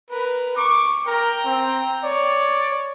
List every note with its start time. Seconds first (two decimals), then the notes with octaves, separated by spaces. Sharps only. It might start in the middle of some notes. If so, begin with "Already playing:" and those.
0.11 A#4 B4
0.57 C#6 D6
1.07 A#4 G5 A#5
1.46 C4
2.04 C#5 D5